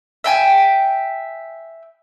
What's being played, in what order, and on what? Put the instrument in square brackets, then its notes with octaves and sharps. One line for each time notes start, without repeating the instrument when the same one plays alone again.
[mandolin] E5 G5 G#5